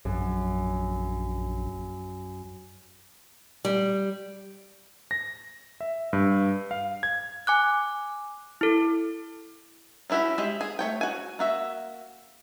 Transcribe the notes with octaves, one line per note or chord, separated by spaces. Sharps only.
A#1 F#2
G3
A#6
E5
G2
F5
G#6
G#5 D6 F#6
E4 A4
C#4 D#4 E4 F#4 G4
G#3 G4 E5
G#4
A3 C#5 G5
F#4 G#5
A#3 F#4 E5